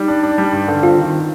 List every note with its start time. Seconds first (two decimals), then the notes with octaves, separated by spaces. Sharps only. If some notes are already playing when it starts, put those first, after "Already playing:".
Already playing: G3 D#4
0.08 D4
0.23 D4
0.38 G3
0.53 G2
0.68 D3
0.83 C4 F4
0.98 D#3